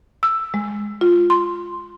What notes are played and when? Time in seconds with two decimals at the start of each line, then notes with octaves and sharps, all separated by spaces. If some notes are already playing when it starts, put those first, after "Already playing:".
0.23 E6
0.54 G#3
1.01 F4
1.30 C6